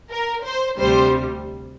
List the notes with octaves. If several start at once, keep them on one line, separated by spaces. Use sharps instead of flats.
A#4
C5
D2 C3 G3 C5